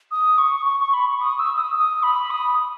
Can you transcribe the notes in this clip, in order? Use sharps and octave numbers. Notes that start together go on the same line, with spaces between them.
D#6
C#6
C#6
C#6
B5
C#6
D#6
E6
D#6
D#6
B5
D#6